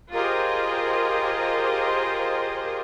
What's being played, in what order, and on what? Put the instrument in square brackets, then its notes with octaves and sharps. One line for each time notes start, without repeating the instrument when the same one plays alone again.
[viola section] F4 G4 G#4 A#4 C5 D#5